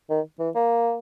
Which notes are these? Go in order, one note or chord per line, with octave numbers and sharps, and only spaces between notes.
D#3
E3
A#3